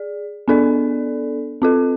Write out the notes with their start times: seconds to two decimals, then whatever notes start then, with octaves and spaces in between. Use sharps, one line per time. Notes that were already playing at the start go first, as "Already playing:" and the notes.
Already playing: G#4 D5
0.48 B3 D4 A4 D5
1.62 C4 F4 A4